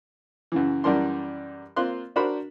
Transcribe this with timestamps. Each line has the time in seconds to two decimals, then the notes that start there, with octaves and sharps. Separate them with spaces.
0.52 F#2 C#3 E3
0.84 F#2 E3 G3 A#4 A5 C6
1.76 A#3 C4 F4 C6 F#6
2.16 D4 F#4 A#4 C5 B5